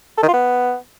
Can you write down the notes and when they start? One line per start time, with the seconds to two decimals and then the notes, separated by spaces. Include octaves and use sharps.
0.18 A4
0.23 D#3
0.28 F4
0.33 B3